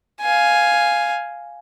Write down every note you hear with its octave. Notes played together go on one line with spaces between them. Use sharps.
F5 G#5